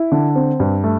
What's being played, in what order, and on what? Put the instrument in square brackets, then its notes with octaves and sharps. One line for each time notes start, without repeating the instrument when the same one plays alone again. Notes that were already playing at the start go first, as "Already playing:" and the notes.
Already playing: [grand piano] E4
D3
C4
G2
A3